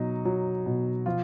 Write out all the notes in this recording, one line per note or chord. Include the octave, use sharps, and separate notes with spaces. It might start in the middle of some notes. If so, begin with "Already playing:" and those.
Already playing: B2 F#3 D#4
F#3
B2
F3 F4